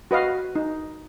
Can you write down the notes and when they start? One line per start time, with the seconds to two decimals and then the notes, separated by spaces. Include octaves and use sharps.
0.11 F#4 B4 D#5 F5
0.55 D#4